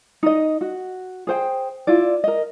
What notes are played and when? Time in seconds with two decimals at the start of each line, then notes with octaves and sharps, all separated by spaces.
0.23 D#4 D#5
0.61 F#4
1.27 G#4 C5 G5
1.87 E4 F4 D5
2.24 A#4 D#5